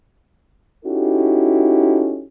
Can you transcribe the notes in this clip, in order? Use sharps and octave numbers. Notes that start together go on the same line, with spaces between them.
C#4 D#4 E4 F#4 G4 A4